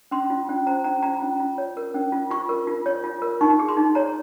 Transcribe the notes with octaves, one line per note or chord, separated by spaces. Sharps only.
C#4 C6
F4
C#4
C5 A#5
C#4 A#5
F4 A#5
C#4
F4
C#5
A#4
C#4
F4
F4 C#6
A#4
F4
C#5
F4
A#4
D#4 C#6
G#4
C6
D#4
C#5 A#5